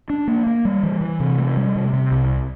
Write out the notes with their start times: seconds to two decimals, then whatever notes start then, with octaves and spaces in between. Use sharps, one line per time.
0.10 D4
0.28 A#3
0.47 A#3
0.65 G3
0.83 E3
1.01 E3
1.20 C3
1.38 A3
1.57 G3
1.75 C3
1.93 C3
2.12 C2